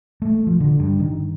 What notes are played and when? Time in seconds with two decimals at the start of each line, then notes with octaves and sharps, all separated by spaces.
0.22 A3
0.47 F3
0.60 D3
0.80 G2
1.00 D#3